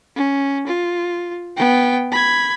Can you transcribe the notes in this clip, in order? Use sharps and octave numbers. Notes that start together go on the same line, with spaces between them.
C#4
F4
B3 G5
B5 G#6